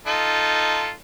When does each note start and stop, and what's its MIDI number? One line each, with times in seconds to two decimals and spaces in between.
0.06 0.92 63
0.06 0.92 65
0.06 0.92 69